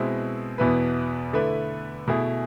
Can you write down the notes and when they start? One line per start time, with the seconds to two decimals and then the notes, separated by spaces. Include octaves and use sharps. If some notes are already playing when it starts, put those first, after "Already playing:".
Already playing: B2 G#3 C4 E4
0.58 E2 B2 B3 E4 B4
1.33 D3 A3 E4 B4
2.07 B2 A3 E4 G#4